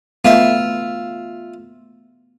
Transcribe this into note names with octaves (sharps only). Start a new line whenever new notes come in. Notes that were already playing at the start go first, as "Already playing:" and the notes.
A3 B3 F4 E5